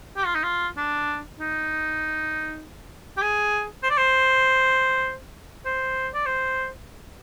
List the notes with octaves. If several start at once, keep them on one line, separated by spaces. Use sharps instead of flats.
G4
F4
D#4
F4
D4
D#4
G4
G#4
C5
D5
C5
C5
D5
C5